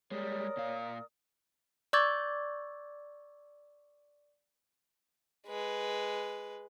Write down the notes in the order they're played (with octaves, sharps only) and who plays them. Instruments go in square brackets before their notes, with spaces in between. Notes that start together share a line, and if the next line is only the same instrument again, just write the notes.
[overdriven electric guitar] G3 G#3 [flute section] A#4 D5 D#6 [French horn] C#5
[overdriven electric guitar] A#2 F5
[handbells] D5 C#6 D6 E6 G#6 A6
[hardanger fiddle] G#3 B4